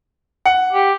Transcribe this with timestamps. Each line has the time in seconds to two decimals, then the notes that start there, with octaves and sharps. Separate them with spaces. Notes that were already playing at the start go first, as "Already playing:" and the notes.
0.46 F#5
0.73 G4